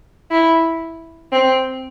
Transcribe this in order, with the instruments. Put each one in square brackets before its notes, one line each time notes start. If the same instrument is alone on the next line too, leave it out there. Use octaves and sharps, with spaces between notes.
[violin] E4
C4